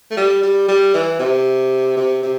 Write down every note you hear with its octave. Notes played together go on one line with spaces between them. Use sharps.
A3
G3
G3
G3
E3
C3
C3
C3